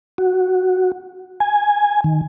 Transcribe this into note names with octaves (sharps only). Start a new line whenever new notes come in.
F#4
G#5
D#3